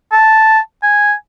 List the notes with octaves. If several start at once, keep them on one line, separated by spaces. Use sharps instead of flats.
A5
G#5